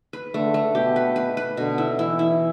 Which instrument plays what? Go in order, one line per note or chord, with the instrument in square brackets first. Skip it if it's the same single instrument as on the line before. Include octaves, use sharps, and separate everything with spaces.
[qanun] B4
[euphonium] D3 [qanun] A3
[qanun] A3
[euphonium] B2 [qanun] G4
[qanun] B4
B4
B4
[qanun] B2 [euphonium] D3
[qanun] E4
[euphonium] E3 [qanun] E4
[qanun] E4